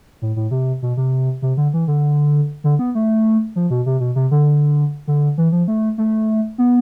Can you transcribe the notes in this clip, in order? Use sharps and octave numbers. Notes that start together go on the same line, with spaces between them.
A2
A2
C3
B2
C3
C3
D3
E3
D3
D3
B3
A3
F3
B2
C3
B2
C3
D3
D3
E3
F3
A3
A3
B3